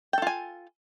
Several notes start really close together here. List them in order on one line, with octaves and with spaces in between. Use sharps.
G5 A4 F4 G#5